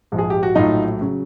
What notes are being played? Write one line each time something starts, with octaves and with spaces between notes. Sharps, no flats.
A#1 G#2 F3
G#4
G4
F#4
A#1 A2 F#3 D#4 F4
C#3 F#3